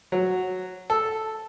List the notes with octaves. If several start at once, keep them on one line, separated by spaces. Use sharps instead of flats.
F#3
A4